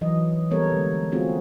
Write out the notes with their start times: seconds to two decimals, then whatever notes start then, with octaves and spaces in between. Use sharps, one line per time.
0.01 E3 F#3 D#5
0.51 G3 A#3 B3 A4 A#4 C#5
0.72 D3 G#3
1.12 A3 A#3 C4 F4 F#4 G#4